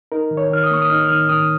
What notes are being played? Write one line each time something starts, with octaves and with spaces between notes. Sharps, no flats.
D#4 A#4
D#3
C#5
D#3 F6
D#6
A#3 C#6
D#6
D#4 F6
D#3 F6
D#3 D#6